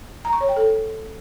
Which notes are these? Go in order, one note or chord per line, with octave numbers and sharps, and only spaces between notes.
A#5
C#6
C#5
G5
A4